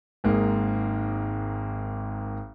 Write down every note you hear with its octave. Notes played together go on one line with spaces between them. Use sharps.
G#1 G#2 G#3 A#3